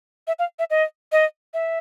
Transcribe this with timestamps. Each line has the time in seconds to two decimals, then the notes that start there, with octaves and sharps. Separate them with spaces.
0.27 E5
0.39 F5
0.59 E5
0.70 D#5
1.12 D#5
1.54 E5